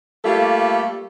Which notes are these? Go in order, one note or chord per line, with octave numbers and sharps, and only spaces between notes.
G3 A3 A#3 F4 A4